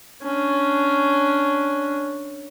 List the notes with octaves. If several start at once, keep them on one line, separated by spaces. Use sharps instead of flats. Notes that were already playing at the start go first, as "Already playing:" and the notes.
C#4 D4